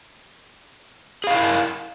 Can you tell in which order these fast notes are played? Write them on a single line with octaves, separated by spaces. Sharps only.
G#4 F5 E4 A#4